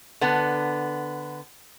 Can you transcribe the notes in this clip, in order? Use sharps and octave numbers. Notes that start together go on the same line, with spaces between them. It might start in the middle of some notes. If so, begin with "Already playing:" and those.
D3 B3